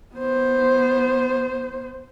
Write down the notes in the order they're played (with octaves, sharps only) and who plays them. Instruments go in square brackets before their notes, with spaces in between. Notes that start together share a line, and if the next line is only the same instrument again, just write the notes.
[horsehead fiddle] B3 C5